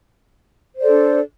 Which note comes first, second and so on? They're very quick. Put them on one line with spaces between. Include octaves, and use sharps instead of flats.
C5 D5 A4 D4